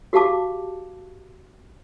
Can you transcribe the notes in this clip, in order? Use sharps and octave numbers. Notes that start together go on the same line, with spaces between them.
F#4 G4 F5 A5 D6